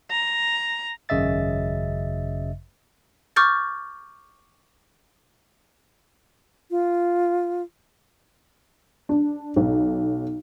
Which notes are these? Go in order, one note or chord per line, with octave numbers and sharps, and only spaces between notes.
A#5
G#1 F#2 C#3 D#5 E5 A6
C#6 D6 F6 G6 A6
F4
D4
B1